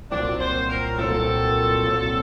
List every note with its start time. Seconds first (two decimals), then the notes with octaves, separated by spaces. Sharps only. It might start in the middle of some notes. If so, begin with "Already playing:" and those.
0.11 C2 A#2 F#3 C4 D4
0.40 C5
0.70 A#4
0.98 C2 A#2 F#3 C4 A4
1.85 C2 A#2 F#3 C4